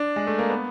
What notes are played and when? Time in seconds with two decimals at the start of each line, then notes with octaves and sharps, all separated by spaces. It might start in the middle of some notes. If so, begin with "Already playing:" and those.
Already playing: D4
0.16 G#3
0.27 A3
0.39 A#3
0.50 B3